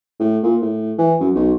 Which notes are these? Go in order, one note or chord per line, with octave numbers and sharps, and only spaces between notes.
A2
A#2
A2
E3
F#2
B1